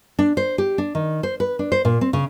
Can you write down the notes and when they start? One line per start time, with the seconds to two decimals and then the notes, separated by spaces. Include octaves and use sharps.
0.19 D4
0.37 C5
0.58 G4
0.78 D4
0.95 D#3
1.23 C5
1.40 B4
1.59 D4
1.72 C5
1.85 A#2
2.01 C4
2.13 C#3